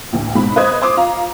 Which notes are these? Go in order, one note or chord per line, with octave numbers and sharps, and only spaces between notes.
A1 D2
G#2 B2 B5
B4 C5 D#5 D#6 G#6
C5 C6 D6 D#6
F4 F5 A#5